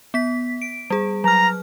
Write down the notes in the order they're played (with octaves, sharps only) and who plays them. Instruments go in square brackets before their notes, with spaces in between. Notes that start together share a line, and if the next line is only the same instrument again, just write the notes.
[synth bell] B3 B6
D7
G3 G#4
[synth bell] F#3 F6 [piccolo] A#5